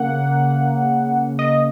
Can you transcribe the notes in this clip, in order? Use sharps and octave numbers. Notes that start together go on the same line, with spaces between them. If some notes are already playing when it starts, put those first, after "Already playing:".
Already playing: C#3 A#3 F#5
D#5